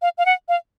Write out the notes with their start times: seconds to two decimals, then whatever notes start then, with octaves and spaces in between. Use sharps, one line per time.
0.02 F5
0.18 F5
0.26 F#5
0.49 F5